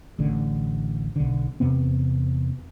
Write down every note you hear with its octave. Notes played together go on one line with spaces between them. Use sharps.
A1 A2 D3
B1 D3
E2 C3 B3 C4